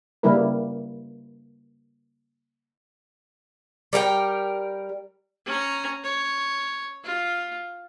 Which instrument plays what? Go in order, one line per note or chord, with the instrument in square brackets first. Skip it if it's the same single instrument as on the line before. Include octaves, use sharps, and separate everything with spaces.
[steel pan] C#3 G3 A#3 E4 A#4 B4
[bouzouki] G3 A#4 F#5 G5
[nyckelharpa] C#4 A#5
C#5
F4